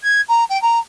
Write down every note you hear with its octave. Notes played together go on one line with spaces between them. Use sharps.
G#6
A#5
G5
A#5